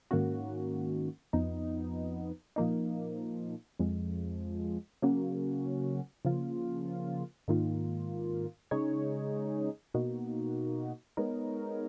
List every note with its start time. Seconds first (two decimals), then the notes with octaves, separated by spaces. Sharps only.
0.11 G#2 D#3 A#3 C#4 F#4
1.33 F2 F3 B3 D#4
2.56 A#2 F3 A#3 D#4
3.79 F2 F3 G#3
5.02 C#3 F#3 A#3 C#4 F#4
6.25 C#3 F3 A#3 F4
7.48 G#2 D#3 A#3 F4
8.71 C#3 G#3 D#4 G#4 C#5
9.94 B2 A#3 D#4 F#4
11.17 G#3 B3 D#4 A#4 C#5